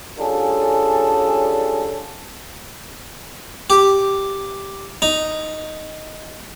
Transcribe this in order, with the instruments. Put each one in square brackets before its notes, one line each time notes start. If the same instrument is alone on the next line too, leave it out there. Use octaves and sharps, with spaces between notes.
[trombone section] G3 C#4 D4 F4 G#4 A4
[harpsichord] G4
D#4